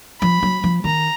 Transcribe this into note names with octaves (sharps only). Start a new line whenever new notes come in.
F3 B5
F#3
F3
D#3 A#5